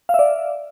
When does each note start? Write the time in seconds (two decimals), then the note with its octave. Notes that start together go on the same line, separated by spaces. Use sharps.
0.09 F5
0.14 E5
0.19 D5